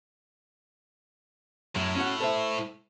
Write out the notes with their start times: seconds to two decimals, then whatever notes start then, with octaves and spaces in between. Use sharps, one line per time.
1.76 F#2 A2
1.96 C#4 F#4 F#5
2.20 A4 C5 E5